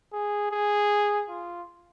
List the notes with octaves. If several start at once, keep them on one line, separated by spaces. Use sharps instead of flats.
G#4
G#4
F4